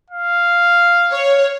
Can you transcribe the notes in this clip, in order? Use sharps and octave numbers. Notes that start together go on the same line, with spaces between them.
F5
C#5